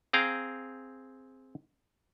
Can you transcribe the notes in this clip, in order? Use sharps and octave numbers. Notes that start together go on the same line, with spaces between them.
C4 G#4 F5 G5 A#5